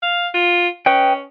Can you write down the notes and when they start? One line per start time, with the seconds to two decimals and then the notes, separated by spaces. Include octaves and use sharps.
0.02 F5
0.34 F4
0.86 C#4 B4 D#5 G5